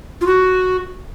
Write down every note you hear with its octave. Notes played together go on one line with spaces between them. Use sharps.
F4
F#4